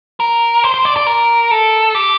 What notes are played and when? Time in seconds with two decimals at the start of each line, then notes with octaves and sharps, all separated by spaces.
0.20 A#4
0.64 C5
0.74 C5
0.85 D5
0.97 D5
1.07 A#4
1.51 A4
1.95 G4